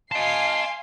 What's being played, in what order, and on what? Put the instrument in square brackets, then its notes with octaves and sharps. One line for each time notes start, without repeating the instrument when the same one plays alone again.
[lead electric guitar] D#5 A5 [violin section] F5 G#5 C7 [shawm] C6